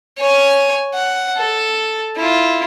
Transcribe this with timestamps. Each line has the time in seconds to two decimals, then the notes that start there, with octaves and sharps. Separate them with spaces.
0.18 C#5 G#5
0.94 F#5
1.37 A4
2.17 E4 F4